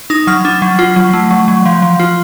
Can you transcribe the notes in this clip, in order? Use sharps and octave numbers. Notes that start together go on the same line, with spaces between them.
D#4 D#6
F#3 F6
D4
F#3
F4
F#3
A3
F#3
F#3
F3
F3
F4